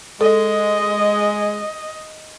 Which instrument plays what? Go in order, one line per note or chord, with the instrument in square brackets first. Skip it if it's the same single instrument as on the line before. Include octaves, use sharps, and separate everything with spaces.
[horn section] G#3 [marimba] A4 [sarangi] D#5